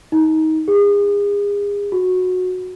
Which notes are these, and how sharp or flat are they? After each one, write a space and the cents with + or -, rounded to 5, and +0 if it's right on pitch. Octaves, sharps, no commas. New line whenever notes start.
D#4 +25
G#4 -35
F#4 -15